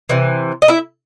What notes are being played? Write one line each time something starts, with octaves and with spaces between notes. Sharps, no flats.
C3 E3
D#5
E4 E5